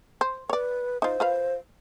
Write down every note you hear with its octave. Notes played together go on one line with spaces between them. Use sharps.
C5
B4 C#5 D5
D#4 F4 C5
F4 B4 F5